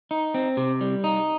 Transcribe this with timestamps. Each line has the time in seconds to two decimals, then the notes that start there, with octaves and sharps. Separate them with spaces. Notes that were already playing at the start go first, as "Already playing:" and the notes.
0.11 D#4
0.34 C4
0.57 C3
0.81 G3
1.04 D#4